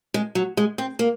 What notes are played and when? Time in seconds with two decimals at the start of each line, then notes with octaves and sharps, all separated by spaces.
0.14 G#3
0.35 F#3
0.57 G#3
0.78 C4
0.99 A#3